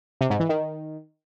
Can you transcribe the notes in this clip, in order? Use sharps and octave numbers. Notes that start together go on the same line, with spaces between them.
C3
G#2
E3
D#3